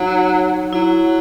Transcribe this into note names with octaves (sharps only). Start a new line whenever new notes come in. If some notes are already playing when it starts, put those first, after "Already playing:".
Already playing: F#3 D#4
F#3 E4